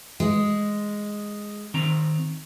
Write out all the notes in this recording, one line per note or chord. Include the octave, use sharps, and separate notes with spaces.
G#3
D#3 C4 A#5